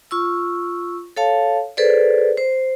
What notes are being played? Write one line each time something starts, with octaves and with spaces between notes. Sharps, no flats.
F4 C#6 E6
A4 C#5 F5 A5
G#4 A4 B4 C5 D5
C5